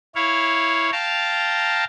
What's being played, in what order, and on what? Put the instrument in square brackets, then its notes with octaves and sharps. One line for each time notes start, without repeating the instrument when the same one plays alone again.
[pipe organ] E4 C#5 F5
F5 G5 A5 A#5